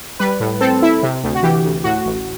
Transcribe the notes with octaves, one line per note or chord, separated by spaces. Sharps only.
G3 B4
A2
C4 A4
E4
C3
D2
F#4
E3 G4
D2
A2 F#4
A1